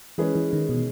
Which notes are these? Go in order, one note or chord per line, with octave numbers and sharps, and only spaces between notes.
E3 G#3 C#4 G#4 B4
E3
D#3
B2